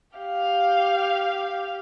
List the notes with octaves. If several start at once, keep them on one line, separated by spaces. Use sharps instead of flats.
G4 F5